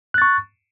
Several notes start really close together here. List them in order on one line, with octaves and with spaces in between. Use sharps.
F#6 A6 C#6